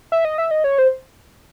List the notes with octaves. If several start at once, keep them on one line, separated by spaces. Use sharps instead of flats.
E5
D#5
E5
D#5
C#5
C5